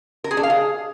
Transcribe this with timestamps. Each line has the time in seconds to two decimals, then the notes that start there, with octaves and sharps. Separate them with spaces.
0.24 A#4
0.31 G#4
0.37 D4
0.43 F5
0.50 G#4